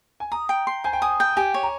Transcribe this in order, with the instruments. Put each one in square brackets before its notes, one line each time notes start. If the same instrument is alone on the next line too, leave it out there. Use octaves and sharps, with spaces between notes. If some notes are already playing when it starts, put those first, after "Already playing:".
[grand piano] G#5
[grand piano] A#5 [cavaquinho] D#6
[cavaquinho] G5
C6
[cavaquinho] C5 [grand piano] G#5
[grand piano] G5
[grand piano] G#5 [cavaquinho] D#6
[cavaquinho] G5
[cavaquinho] G4 [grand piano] G#5
[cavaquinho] C#5
[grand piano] A#5